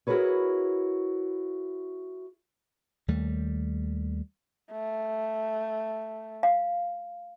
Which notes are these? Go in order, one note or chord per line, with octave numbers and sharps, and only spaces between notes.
E4 F#4 G#4 A#4 B4 C#5
D#2 G3 A3
A3
F5